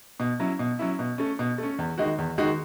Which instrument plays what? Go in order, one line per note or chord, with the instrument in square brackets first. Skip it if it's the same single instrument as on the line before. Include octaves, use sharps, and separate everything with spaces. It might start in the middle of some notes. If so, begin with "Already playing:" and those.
[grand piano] B2
F#3 C#4 E4
B2
F#3 C#4 E4
B2
A3 C#4
B2
A3 C#4
E2
D#3 G#3 D#4 F#4
E2
D#3 G#3 D#4 F#4